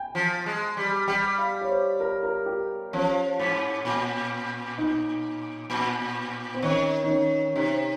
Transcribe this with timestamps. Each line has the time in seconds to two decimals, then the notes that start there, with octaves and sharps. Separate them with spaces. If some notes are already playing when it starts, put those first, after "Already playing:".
Already playing: G5 G#5
0.15 F3
0.46 G#3
0.77 G3
1.08 G3 G5
1.38 F5
1.61 C#5
1.69 C5
2.00 A#4
2.23 A#4
2.46 G4
2.93 F3 C#4
3.39 G#2
3.85 A#2
4.78 D#4
5.70 A#2
6.54 C4
6.62 D#3 C#4
7.03 D#4
7.09 C#4
7.56 C3 D#4